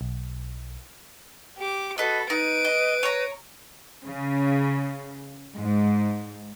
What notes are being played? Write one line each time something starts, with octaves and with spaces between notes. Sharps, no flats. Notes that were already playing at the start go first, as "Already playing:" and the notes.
B1
G4 D6
F#4 A4 B4 D#5
D#4 B4 D7 D#7
D#5
C#5 A#5
C#3
G#2